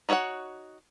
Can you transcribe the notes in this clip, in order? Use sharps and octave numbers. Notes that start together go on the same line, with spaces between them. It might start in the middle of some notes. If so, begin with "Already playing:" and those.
D#4 F#4 C#5 E5 F#5